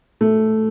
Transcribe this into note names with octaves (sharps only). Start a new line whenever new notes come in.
A3